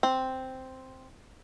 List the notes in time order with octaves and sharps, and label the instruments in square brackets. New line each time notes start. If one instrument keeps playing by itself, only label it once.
[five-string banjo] C4